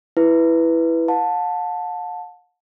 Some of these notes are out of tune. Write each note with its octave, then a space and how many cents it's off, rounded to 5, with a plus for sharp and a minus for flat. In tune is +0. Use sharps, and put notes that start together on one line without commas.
E4 +0 B4 +0
F#5 -45 A5 +0